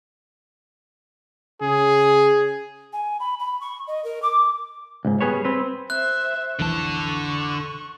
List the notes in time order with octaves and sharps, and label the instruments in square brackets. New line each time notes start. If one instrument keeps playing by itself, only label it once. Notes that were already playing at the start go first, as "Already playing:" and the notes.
[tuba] C#3 [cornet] G#4
[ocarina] G#5
B5
B5
C#6
D#5
A#4
D6
[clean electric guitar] C#2 G#2
G3 B3 G#4 B4 C#5
C4 B4
[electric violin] C5 E5 [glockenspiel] F#6
[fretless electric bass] F1 B1 E3 [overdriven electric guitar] D3 A5 [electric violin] C#6